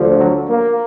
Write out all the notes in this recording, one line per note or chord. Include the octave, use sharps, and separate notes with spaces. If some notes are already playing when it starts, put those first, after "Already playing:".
Already playing: D2 D3 F3
F#3
A#3